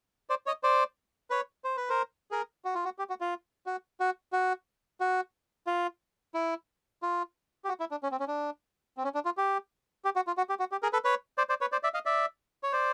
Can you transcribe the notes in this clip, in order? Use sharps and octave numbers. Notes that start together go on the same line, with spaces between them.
C5 D5
C#5 D#5
C5 D5
B4 C#5
C5
B4
A#4 C5
G#4 A#4
F#4
F4
F#4
G4
F#4
F4
F#4
F#4
F#4
F#4
F4
E4
F4
G4
F#4
E4
D4
C#4
C4
C#4
D4
C4
C#4
D4
F4
G4
G4
F#4
F4
F#4
G4
F#4
G4
G#4 A#4
A4 B4
B4 C#5
C5 D5
C5 D5
B4 C#5
C5 D5
D5 E5
D#5 F5
D5 E5
C#5
C5 D5